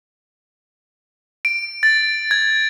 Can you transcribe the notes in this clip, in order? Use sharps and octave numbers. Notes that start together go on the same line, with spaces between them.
D7
A6
G#6